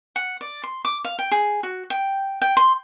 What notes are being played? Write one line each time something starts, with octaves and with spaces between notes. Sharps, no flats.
F#5
D5
C6
D6
F5
G5
G#4
F#4
G5
G5
C6